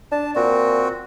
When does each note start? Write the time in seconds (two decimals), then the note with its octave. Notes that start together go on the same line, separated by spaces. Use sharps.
0.12 D4 A5
0.36 A#2 C4 F#4